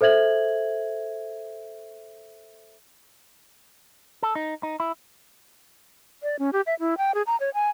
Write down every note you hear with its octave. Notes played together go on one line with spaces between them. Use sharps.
A4 C5 E5 G#6 F#7
A4
D#4
D#4
E4
D5
C#4
G4
E5
E4
G5
G#4
A#5
C#5
G#5